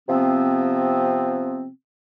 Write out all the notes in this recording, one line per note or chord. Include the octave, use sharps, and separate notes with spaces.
C3 F3 B3 C4